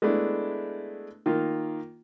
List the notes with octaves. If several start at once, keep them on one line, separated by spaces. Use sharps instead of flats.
G#3 A3 B3 D4 E4
D#3 A#3 F4